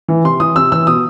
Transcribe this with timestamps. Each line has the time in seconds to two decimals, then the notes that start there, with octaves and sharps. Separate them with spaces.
0.08 E3
0.24 C3 C6
0.40 E3 D#6
0.56 C3 E6
0.72 E3 E6
0.87 B2 D#6